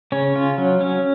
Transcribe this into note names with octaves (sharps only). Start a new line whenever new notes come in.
C#3 C#4 C#5
F4
F#3
C#4